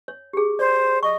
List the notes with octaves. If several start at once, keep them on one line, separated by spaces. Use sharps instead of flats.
C#5
G4 G#4
C5 D5
D#5 C#6